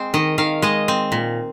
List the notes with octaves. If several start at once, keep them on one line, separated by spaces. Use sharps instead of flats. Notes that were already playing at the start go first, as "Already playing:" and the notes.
Already playing: G#3 C4
D#3 D#5
D#3 F5
G#3 D#5
C4
A#2